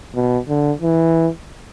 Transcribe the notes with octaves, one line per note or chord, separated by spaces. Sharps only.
B2
D3
E3